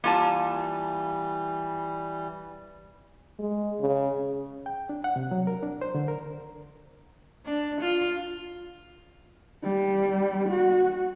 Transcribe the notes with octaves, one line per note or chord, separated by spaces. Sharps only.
E3 G3 A#3 F4 A5
G#3
C#3
G5
D4
F#5
C3
F#3
A#4
D4
C5
D3
A#4
D4
F4
G3
F#4